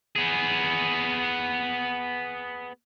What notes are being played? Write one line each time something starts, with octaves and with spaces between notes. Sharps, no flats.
B3 G#4